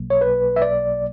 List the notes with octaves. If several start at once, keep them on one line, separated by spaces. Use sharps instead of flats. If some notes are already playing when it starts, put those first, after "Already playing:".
Already playing: B1 B2 F#3 A#3
C#5
B4
E5
D5